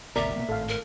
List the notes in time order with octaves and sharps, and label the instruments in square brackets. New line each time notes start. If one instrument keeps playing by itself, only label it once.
[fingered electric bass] G#1 D2 B2 [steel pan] A#4 D5 A#5 [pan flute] E5
[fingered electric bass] B2 F#3 A#3
[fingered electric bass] G#1 A2 [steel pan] A4 F5
[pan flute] A#4